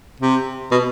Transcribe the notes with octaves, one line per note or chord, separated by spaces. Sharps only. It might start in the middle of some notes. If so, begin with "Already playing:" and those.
C3
B2